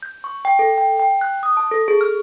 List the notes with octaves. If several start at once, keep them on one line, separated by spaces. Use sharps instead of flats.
G6
C#6
G5
A4
G5
G5
F#6
D#6
A5
A4
G#4
F6